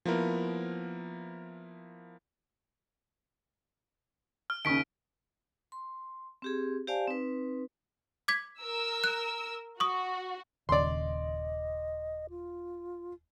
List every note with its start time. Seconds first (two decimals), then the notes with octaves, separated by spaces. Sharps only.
0.05 F3 A#3 B3 E4 A#4
4.50 F6
4.65 D#2 C#3 C#6 B6 D7
5.72 C6
6.42 C4 G4 G#4
6.87 G4 C5 D5 F5 G#5 A5
7.07 C4 D#4 B4
8.28 D6 G#6 B6
8.60 A#4 E6
9.04 F#6
9.80 F#4 C#6 D#6
10.69 D#1 D#2 C#3 D5 D#5 C6
12.30 F4